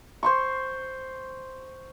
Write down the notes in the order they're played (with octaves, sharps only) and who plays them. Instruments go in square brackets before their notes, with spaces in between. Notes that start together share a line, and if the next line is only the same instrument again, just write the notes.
[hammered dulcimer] C5 C6 C#6